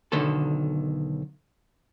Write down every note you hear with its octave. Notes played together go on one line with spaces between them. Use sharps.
B1 D3 D#3 A4